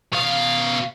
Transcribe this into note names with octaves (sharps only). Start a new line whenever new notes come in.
B2 F5